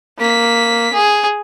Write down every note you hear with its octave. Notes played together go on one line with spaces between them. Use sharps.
A#3 B6
G#4